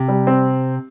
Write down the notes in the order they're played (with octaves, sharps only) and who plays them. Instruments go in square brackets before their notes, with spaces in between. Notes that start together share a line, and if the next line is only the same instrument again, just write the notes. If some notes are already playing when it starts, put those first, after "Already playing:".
Already playing: [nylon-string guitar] C3
[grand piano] G3
C4